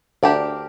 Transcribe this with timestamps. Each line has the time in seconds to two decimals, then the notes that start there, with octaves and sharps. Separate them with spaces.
0.23 D2 D3 D4 G4 A#4 D5